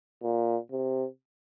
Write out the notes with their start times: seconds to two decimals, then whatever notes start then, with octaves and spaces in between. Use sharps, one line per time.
0.23 A#2
0.71 C3